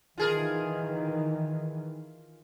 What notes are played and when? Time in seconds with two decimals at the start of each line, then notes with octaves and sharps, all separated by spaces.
0.18 D#3 E3 F4 G#4 A#4